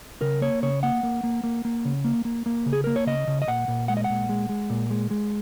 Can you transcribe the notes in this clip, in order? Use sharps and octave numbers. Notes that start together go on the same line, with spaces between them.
C#3 A#4
A#3 C#5
C#3 C#5
A#3 F#5
A#3
A#3
A#3
A#3
C#3
A#3
A#3
A#3
C#3
G#4
A#3 A#4
C#5
C#3 D#5
C#3
D#5
A#2 F#5
A#2
G#3 F#5
D#5
F#5
A#2
G#3
G#3
A#2
G#3
G#3